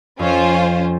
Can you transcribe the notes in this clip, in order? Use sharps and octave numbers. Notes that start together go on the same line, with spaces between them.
F2 C#4 F4 C5